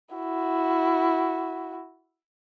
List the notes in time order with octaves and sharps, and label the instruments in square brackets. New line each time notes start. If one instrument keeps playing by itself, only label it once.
[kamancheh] E4 F#4